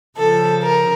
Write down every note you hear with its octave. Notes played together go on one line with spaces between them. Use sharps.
C#3 F3 A4
A#4